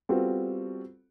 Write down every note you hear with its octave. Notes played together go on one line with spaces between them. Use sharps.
G3 B3 C4 F4 F#4 A4